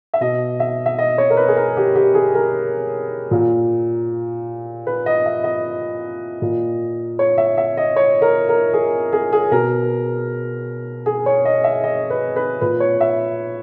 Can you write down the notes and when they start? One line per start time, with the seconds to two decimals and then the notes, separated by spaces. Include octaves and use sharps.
0.14 E5
0.21 B2 D#5
0.60 E5
0.86 E5
0.98 D#5
1.18 C#5
1.30 A#4
1.37 B4
1.48 G#4
1.56 A#4
1.77 G4
1.95 G4
2.14 G#4
2.34 A#4
3.31 A#2
4.87 B4
5.06 D#5
5.26 E5
5.44 D#5
6.42 A#2
7.19 C#5
7.38 E5
7.57 E5
7.77 D#5
7.96 C#5
8.22 A#4
8.49 A#4
8.73 G#4
9.13 G#4
9.33 G#4
9.51 B2 A#4
11.06 G#4
11.26 C#5
11.45 D#5
11.64 E5
11.84 D#5
12.10 B4
12.36 B4
12.61 A#2 B4
12.80 C#5
13.01 E5